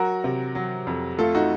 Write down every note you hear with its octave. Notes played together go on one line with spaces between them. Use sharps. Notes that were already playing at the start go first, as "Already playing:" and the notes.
Already playing: F#3 F#4 A#4
C3
F#3
F2
A3 F4 A4
D#4 F#4